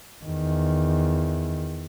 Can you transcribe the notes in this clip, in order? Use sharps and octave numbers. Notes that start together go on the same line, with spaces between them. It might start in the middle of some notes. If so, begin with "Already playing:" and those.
E2 D#3